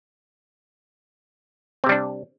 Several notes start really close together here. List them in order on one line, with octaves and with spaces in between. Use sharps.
C4 C3 G3 D4